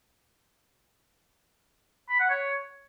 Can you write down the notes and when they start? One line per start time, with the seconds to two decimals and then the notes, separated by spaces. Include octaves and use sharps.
2.09 B5
2.19 F#5
2.30 C#5